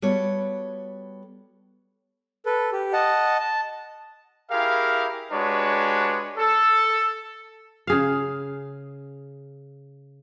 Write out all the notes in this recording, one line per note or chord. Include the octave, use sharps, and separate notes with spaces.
G3 B3 F#4 A4 C#5
A4 B4
G4
D#5 F#5 A5
A5
E4 G4 G#4 A#4 F5
G#3 D4 F#4 G4 B4 C#5
A4
C#3 G#4 F5